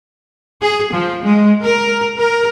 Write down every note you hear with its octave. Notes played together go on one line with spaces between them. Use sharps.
G#4
F3
G#3
A#4
A#4